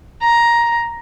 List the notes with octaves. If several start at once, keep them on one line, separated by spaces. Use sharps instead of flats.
A#5